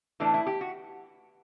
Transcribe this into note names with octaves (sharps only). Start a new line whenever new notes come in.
A2 E3 A3 D4
E4
G4
F#4